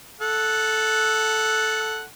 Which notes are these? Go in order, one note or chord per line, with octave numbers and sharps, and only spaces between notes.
A4 F#5